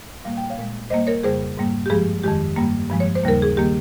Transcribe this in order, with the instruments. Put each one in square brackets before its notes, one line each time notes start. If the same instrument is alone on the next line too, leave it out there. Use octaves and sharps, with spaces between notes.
[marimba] A#2 G3 A#3 F5
G5
C#5 F5
A#2 G#3
A#2 G3 A#3 C5 D#5
A#4 C#5
F2 C#3 G3 G#4 C5
G#2 G3 A#3
G4
G2 F3 G#3 G#4
F2 D#3 G#3 G4
G2 G3 A#3
G2 F3 G#3
C#5
C5
D#2 C#3 G3 A#3 A#4
G#4
D#3 G3 A#3 G4